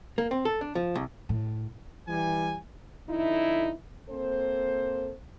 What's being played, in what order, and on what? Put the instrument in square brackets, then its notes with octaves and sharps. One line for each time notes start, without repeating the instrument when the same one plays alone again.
[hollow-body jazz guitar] A#3
C4
A4
D4
F3
C2
[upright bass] A2
[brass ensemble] E3 G3 G#5
[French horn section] F2 D3 D#4 E4
A#3 C4 A4 C5